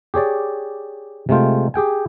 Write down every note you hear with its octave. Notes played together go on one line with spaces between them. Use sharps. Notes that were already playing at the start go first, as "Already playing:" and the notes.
G4 G#4 C#5 D5
C3 G#3 A3 F4 G5
G4 G#4 G5 G#5